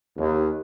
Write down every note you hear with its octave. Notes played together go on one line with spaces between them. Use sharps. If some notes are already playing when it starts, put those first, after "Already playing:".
D#2